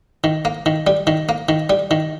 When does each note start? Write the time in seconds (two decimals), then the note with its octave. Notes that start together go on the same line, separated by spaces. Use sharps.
0.24 D#3
0.45 A#3
0.66 D#3
0.87 G3
1.07 D#3
1.29 A#3
1.49 D#3
1.70 G3
1.91 D#3